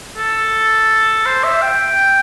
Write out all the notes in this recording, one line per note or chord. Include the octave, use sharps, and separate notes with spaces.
A4
C5
E5
G5